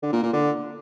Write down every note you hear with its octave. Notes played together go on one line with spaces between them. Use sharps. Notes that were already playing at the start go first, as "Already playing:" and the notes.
D3
A#2
A#2
D3